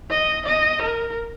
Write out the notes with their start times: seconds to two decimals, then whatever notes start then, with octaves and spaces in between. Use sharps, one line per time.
0.10 D#5
0.46 D#5
0.82 A#4